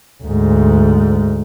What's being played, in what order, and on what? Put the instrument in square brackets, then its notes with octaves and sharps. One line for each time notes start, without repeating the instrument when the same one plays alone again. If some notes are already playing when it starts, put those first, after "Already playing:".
[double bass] D2 G#2